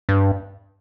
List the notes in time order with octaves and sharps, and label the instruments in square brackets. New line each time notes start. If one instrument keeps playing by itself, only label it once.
[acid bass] G2